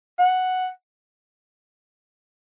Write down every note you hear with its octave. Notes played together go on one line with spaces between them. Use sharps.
F#5